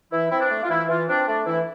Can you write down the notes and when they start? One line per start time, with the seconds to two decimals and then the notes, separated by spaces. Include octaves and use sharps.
0.11 E3 E4
0.30 C4 E4
0.41 D4
0.50 A3
0.63 F4
0.70 E3 E4
0.88 E3 F4
1.08 C4 D4
1.27 A3 D4
1.46 E3 E4